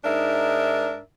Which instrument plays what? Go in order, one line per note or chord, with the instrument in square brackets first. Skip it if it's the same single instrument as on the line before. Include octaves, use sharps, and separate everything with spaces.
[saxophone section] G#2 D4 D#4 A#4 E5